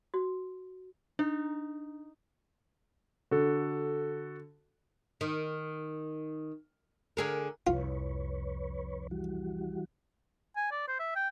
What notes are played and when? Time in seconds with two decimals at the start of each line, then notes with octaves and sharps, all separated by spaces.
0.14 F#4
1.19 D4 D#4
3.31 D3 F#4 A4
5.21 D#3
7.17 D3 G#4 A#4
7.67 C2 F2 F4 B4 C#5
9.11 E3 G3 F#4
10.56 G#5
10.71 D5
10.88 C5
10.99 E5
11.15 G5